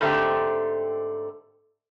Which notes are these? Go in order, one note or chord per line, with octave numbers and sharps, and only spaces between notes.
G#2 D3 A3 C4 G4